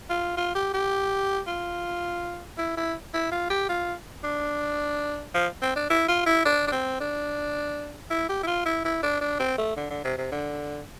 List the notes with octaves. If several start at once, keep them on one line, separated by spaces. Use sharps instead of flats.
F4
F4
G4
G4
F4
E4
E4
E4
F4
G4
F4
D4
F3
C4
D4
E4
F4
E4
D4
D4
C4
D4
E4
G4
E4
F4
E4
E4
D4
D4
C4
A3
D3
D3
C3
C3
D3